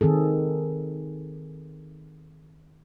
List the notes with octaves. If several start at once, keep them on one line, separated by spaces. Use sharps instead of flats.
D#3 C4 G#4 A4